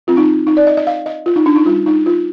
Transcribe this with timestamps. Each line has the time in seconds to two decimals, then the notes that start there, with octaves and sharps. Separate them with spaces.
0.07 F3 C4 F4
0.17 D#4
0.47 D#4
0.57 D5
0.67 D#5
0.77 D#5
0.87 F5
1.06 D#5
1.26 F4
1.36 D#4
1.46 D4
1.56 D#4
1.65 G3 D4 F4
1.86 D#4
2.06 F4